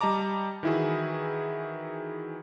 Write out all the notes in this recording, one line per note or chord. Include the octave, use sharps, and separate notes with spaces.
G3 D#5 A5 A#5 D6
D#3 E3 E4 F#4 G#4